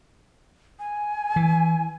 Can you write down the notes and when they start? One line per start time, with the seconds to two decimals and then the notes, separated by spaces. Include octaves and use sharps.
0.79 G#5
1.36 E3